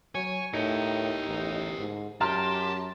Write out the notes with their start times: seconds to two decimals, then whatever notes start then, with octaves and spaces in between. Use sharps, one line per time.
0.15 F#3 C#5 G#5
0.54 A2 D#4 G4 A#4 C#7
1.27 A1
1.78 G#2
2.21 F#2 G4 A5 A#5 C6 F6